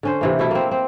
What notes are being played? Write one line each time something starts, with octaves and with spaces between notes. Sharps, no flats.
D3 C#4 C5
C3 E3 A#3
B2 A3 E4 A4
A#3 C4
C4